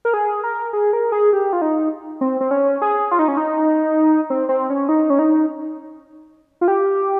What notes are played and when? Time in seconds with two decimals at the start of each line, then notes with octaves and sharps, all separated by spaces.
0.05 A#4
0.14 G#4
0.44 A#4
0.73 G#4
0.93 A#4
1.12 G#4
1.33 G4
1.53 F4
1.62 D#4
2.21 C4
2.41 C4
2.51 C#4
2.82 G#4
3.11 F4
3.19 D#4
3.28 C#4
3.37 D#4
4.30 C4
4.49 C4
4.70 C#4
4.89 D#4
5.10 C#4
5.19 D#4
6.61 F4
6.68 G4